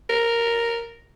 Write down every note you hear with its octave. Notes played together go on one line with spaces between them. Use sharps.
A#4